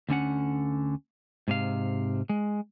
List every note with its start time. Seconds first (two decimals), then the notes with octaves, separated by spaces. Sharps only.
0.09 D2 D3 C#4 F#5
1.48 G#2 C3 F5
2.29 G#3